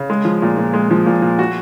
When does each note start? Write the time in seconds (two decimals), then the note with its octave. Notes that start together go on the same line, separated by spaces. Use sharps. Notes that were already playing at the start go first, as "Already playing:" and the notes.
Already playing: C#3
0.10 G#3
0.25 F3
0.42 A#2
0.57 A#2
0.73 G#3
0.91 F3
1.06 A#2
1.22 A#2
1.39 F#4